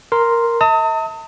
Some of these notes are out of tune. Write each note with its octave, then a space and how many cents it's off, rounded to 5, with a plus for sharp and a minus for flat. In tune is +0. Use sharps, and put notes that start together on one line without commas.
A#4 +0 C6 +0
E5 -45 A5 +45 D#6 +35